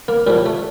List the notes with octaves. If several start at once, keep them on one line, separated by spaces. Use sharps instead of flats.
A#3
A#2 F3 G3
A3